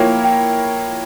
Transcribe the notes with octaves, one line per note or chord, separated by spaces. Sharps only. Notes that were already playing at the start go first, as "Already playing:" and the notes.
Already playing: F3 A#3 E4 A#4 C#5 G5
G5